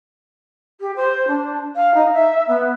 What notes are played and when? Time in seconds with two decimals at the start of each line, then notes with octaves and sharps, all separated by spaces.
0.80 G4
0.96 C5
1.27 D4
1.75 F5
1.94 D#4
2.13 E5
2.47 B3